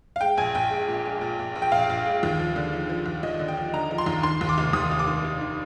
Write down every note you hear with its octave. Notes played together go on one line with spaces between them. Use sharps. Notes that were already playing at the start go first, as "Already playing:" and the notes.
F5
G#3 G5
A#1 G#5
A#1 G5
G#3
A#2
G#3
A#1
A#1
A#1
G5
A#1 F5
A#1
G#3
D#2
F3
D3
F3
F3
D#2
D#2 D#5
D3
G5
F3
D3 A#5
F3
C6
D#2
D#3 C6
D#2
D6
F1
D#2 D#6
F1
D6
D#3
F1
D#3